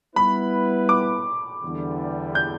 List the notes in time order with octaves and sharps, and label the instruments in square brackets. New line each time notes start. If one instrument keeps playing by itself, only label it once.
[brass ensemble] G3 B3 E4 B4 [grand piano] B5
[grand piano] D6
[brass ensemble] E2 D3 G3
[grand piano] G6